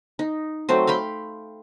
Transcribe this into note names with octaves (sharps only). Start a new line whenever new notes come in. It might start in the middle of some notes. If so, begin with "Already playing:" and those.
D#4
F#3 A3 C4 C5
F5 G5 B5 C6